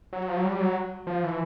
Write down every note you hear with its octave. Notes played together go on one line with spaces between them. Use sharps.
F#3
F3
F#3
G3
F#3
F3
E3